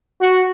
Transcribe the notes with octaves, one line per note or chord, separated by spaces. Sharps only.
F#4